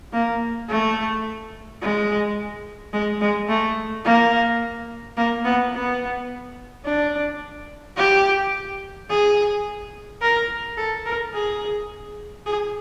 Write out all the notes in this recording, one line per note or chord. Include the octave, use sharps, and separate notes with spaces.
A#3
A3
G#3
G#3
G#3
A3
A#3
A#3
B3
B3
D4
G4
G#4
A#4
A4
A#4
G#4
G#4